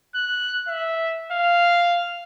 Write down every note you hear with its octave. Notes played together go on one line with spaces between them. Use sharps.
F#6
E5
F5